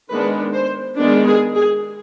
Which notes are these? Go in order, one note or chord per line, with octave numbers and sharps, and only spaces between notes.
D#3 G#3 B3 D4 B4
C5
D#3 G#3 B3 D4
G#4
G#4